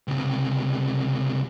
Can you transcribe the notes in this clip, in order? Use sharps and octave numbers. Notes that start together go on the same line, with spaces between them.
C#2 C3